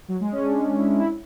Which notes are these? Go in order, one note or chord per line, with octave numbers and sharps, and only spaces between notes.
F#3
G#3
C#4
D4
E4
E4